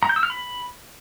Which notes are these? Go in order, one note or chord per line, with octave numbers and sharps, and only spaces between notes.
A#5
G6
E6
F6
B5